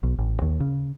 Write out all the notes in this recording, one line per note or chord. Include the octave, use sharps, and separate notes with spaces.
B1
A1
D#2
C#3